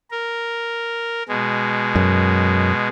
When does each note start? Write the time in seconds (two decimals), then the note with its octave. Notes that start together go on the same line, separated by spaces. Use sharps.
0.11 A#4
1.28 B2 G#3
1.95 F#2